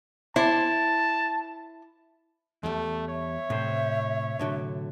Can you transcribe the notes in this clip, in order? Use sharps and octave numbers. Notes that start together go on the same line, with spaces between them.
E4 C5 A5
E2 G3 A3
C#5 E5
A2 C3 C5
A2 D3 F#3